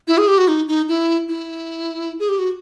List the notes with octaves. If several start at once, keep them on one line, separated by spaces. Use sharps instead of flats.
E4
G#4
G4
F#4
D#4
D#4
E4
E4
G#4
G4
F#4